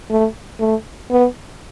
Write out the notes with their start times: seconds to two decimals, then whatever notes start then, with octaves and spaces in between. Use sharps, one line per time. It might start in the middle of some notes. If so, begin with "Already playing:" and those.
0.10 A3
0.60 A3
1.10 B3